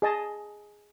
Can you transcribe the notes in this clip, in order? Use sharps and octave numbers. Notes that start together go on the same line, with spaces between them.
G#4 D#5 A5